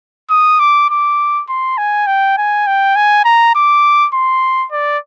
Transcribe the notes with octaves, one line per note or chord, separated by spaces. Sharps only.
D#6
D6
D6
C6
G#5
G5
G#5
G5
G#5
A#5
D6
C6
D5